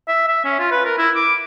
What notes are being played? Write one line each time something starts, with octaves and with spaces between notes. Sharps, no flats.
E5
E5
C#4
F4
B4
A#4
E4
D6